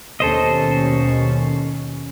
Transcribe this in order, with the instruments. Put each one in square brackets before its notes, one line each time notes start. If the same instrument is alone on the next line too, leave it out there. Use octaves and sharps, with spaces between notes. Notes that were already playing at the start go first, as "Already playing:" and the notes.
[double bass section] D#2 B2 C#4 [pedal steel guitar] A4 C5 D#5